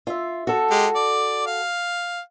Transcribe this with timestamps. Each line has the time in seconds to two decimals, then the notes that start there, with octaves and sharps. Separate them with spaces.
0.07 F4 E5
0.47 F#4 A4
0.71 G#3 G4
0.95 D5
1.47 F5